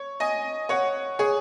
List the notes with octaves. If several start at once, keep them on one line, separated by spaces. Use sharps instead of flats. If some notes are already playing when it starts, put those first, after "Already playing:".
Already playing: C#5
D#5 G#5
C#5 F#5
G#4 C#5